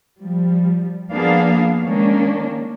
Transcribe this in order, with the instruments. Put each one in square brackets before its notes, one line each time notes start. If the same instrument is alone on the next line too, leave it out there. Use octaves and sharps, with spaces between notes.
[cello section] F3 G3
F3 A#3 B3 D4 G#4 F5
D#3 G#3 A#3 C#4 D4